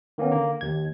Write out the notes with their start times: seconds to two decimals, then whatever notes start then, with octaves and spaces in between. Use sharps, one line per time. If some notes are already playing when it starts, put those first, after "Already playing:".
0.18 D#3 A#3 B3 C#4
0.32 D3 A#3
0.61 D#2 G#6